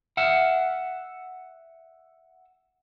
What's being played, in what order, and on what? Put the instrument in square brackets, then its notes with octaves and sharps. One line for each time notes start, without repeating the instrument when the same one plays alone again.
[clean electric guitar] E5 F#5